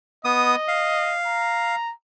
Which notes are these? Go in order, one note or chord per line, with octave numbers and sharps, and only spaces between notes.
B3 D#5 D#6
F5
A#5